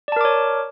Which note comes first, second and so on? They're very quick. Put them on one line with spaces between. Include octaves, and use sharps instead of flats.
D5 A5 A#4 D6 C#5